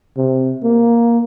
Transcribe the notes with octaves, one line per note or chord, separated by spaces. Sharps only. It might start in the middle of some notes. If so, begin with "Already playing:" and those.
C3
A#3